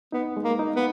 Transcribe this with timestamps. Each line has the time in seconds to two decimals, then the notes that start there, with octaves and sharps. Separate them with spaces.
0.12 B3 D#4
0.37 G#3
0.44 A#3
0.59 D#4
0.76 B3